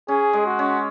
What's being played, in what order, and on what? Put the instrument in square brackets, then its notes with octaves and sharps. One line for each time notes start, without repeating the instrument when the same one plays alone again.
[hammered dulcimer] C#4 [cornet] G#4
[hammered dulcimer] G#3
[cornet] F#4
[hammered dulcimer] C#4